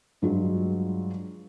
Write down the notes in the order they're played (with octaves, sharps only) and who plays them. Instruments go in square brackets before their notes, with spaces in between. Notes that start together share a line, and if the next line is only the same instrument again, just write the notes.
[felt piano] G2 F#3 G#3 F4